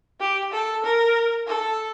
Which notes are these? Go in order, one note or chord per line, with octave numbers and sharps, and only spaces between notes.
G4
A4
A#4
A4